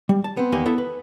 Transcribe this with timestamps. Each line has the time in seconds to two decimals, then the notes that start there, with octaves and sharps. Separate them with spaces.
0.09 G3
0.24 A5
0.37 B3 C4
0.52 E2 D#3 A#3 B3 G4 G#5
0.66 B3 E4 A4 E5
0.78 B4